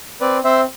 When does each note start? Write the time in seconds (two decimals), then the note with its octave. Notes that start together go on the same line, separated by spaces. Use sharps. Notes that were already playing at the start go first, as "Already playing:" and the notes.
0.21 C4 B4 D5
0.44 C4 C5 E5